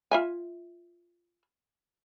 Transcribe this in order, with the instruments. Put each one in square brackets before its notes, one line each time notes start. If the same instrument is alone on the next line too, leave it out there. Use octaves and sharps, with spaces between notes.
[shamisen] F4 E5 G#5